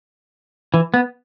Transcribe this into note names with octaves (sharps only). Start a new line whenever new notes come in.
E3
B3